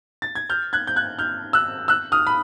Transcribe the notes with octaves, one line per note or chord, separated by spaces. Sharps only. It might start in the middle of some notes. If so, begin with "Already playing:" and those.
A6
G#6
F6 G6
F#6 G#6
G6
F#6 G#6
F6 G6
E6 F#6
E6 F#6
D#6 F6
B5